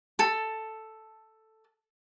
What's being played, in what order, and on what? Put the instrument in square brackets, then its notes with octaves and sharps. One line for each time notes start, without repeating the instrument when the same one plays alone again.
[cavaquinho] A4 A5